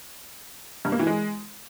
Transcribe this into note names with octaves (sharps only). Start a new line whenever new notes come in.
G2
A#3
E3
G#3